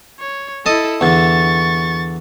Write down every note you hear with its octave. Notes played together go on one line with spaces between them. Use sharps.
C#5
E4 A4 D#5 A5
E2 D3 C#6 A6